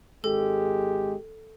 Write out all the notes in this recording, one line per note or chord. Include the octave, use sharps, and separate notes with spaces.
G#1 G#3 G4 A4